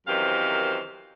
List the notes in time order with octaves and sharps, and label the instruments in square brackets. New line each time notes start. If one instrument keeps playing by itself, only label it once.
[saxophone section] F#2 C3 D#3 E3 C5 F5